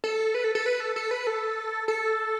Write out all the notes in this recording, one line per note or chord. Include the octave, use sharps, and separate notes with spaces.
A4
B4
A4
A4
B4
A4
A4
B4
A4
A4